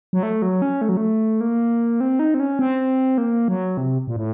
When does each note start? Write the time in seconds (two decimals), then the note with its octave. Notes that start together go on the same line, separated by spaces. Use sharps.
0.13 F#3
0.23 A3
0.42 F#3
0.62 C#4
0.81 A3
0.89 F#3
0.97 A3
1.41 A#3
2.01 C4
2.19 D#4
2.34 C4
2.40 C#4
2.59 C4
3.18 A#3
3.48 F#3
3.77 C3
4.08 A#2
4.16 A2